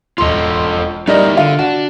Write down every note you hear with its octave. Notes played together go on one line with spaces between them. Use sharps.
E1 F4 A4 D#5 C6
G3 D#4 E4 G4 A#4 D#5
D3 F4
D4 F#4